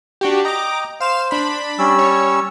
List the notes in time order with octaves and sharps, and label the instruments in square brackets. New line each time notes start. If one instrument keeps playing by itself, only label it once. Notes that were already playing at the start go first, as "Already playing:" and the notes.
[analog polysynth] D4 F#4 G4
[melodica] D#5 G5 [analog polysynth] A#5 D6
[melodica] C5 [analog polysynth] F5 E7
[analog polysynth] D4 B5
[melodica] G3 C#4 E6
[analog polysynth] C#5